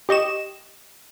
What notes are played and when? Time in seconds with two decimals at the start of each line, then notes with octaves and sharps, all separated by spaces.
0.09 G4 D#5 C#6 E7